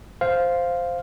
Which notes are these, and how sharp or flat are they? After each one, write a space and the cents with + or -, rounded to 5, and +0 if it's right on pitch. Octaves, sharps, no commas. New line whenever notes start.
C5 +0 F5 +0